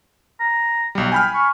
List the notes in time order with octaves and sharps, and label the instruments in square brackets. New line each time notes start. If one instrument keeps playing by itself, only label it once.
[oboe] A#5
[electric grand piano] B1 G3
[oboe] G5 [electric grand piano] G#5 B5 F6
[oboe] C#6